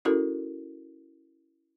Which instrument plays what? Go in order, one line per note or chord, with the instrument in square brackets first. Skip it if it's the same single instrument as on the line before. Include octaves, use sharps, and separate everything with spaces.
[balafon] C#4 E4 F#4 A4 A#4